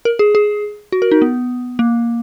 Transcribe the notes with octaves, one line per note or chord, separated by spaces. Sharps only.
A#4
G#4
G#4
F#4
A#4
D#4
B3
A#3